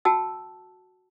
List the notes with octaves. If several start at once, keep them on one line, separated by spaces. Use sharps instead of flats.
F#4 G5 A5 E6